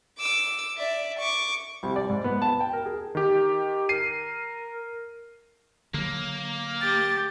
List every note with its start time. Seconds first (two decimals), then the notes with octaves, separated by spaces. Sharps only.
0.19 D6 E6
0.78 D5 E5
1.19 C#6 D6
1.83 C2
1.96 D5
2.10 G#2
2.24 B3
2.42 A5
2.61 G5
2.73 A#4
2.86 G#4
3.15 D#3 G4
3.89 A#4 C7 D#7
5.94 D3 F#3 A#3
6.81 G4 A6